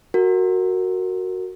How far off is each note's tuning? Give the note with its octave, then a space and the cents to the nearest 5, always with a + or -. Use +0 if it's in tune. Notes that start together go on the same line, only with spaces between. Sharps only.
F#4 +0 A#4 -15